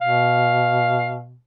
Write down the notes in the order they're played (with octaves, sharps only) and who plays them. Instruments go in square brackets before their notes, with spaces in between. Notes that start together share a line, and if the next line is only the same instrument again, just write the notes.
[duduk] B2 [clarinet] F5